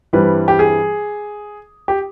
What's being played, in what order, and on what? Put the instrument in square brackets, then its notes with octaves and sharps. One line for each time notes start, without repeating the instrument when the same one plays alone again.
[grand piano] G2 E3 G3 C4 B4
G4
G#4
G4